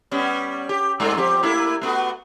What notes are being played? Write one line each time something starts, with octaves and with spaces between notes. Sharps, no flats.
G3 B3 C#4
G4
G2 G#3 A3
F3 C4 G4
A3 A#3 E4
A3 B3 F#4